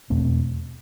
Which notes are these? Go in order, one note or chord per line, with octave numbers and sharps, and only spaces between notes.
E2 B2 A3 C4